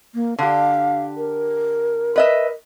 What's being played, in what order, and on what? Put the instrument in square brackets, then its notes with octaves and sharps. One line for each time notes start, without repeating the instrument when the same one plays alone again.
[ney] A#3
[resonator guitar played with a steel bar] D3 G4 [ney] F5
[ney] A#4
[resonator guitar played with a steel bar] B4 D#5 E5